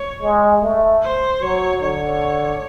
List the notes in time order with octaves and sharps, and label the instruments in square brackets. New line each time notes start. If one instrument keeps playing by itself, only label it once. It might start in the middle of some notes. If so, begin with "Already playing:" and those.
Already playing: [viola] C#5
[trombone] G#3
A3
[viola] C5
[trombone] F#3 [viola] C#5
[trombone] D3 [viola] C#5